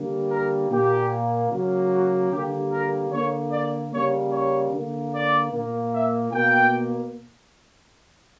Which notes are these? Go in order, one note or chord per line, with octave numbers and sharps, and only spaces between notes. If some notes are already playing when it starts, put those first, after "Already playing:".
Already playing: D3 G3 A#3
A#4
A#2 A#3 G4
C#3 F#3 A#3
F#4
D3 G3 A#3 G4
A#4
D3 A#3 C#5
D5
C#3 G3 A#3 C#5
C#5
D3 A#3
D5
A#2 A#3
E5
B2 A#3 G5